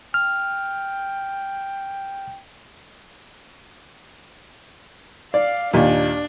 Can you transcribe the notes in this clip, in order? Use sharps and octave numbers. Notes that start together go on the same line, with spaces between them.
G5 F6
D5 F5
D#2 A#2 D4